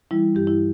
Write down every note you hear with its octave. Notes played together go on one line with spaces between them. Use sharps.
E3 G3 E4
G2 G4
E4